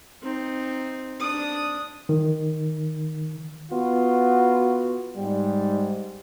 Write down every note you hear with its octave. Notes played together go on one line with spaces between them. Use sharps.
C4 D#4
D4 D#6
D#3
B3 F4 F#4
G#2 G3